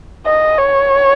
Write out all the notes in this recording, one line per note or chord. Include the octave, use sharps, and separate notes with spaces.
D#5
C#5